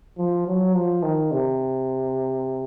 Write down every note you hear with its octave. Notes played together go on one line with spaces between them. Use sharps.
F3
F#3
F3
D#3
C3